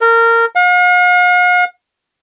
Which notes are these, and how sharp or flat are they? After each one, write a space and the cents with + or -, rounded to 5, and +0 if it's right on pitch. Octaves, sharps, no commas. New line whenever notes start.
A#4 -20
F5 +45